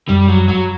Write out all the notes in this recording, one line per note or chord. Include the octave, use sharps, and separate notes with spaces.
F#2 G3
F#3
F#3